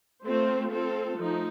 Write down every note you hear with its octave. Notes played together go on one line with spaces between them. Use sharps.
A3 C4 F4 C5
C4 F4 A4
F3 A3 D#4